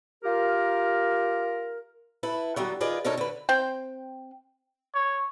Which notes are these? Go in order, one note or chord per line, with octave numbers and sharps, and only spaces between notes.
F4 G4 A#4
E4 A4 B4
D3 F#3 G3 B3
D#3 F4 G#4 B4 D5 D#5
B2 D4 D#4 A4 A#4 C#5
D3 B4
C4 G5
C#5